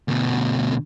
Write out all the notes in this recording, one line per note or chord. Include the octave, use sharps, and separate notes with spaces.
D2 B2